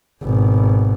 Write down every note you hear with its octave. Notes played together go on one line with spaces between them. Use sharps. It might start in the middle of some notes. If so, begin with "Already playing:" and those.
G#1 B2